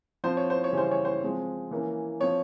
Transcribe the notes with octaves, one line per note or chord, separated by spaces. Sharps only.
F3 C4 C5
C#5
C5
C#5
C#3 E3 G3 C#4 C5
C#5
C5
F3 G#3 C4
E3 A#3 C#4
F3 C4 C#5